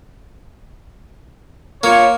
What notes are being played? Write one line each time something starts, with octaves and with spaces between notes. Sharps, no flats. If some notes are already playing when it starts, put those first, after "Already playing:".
A#3 F4 C#5